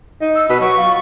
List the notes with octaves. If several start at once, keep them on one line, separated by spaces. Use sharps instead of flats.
D#4
E6
B2 B4
F#3 C#6
F4